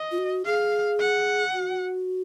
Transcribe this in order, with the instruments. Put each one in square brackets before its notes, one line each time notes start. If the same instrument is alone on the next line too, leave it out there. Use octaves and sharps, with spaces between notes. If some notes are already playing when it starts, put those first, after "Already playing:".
Already playing: [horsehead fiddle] D#5
[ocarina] F4
F#4
[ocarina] G#4 [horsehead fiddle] F5
[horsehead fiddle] F#5
[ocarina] F#4